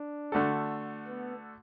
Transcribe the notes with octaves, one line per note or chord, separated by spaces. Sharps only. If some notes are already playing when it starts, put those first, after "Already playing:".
Already playing: D4
D3 A3 F#4 A4
B3